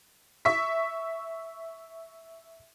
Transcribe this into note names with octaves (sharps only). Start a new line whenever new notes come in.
E5 C#6 B6